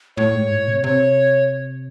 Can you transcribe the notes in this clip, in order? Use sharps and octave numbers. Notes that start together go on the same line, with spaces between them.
A2 C#5
G#2
A2
C3
C3 C#5